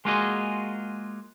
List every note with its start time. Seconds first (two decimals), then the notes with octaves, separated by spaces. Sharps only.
0.05 G#3 A#3 F4 F#4 G#4 D#5